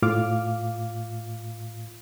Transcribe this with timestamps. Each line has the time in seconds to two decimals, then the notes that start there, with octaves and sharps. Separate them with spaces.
0.02 A2 F4 F5 D6 F6